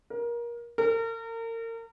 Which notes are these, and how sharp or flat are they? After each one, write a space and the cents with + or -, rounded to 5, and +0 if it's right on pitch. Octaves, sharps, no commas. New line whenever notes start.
A#4 +25
A#4 -35